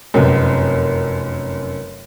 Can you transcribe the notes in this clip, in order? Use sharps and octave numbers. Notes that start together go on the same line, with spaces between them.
F1 F#2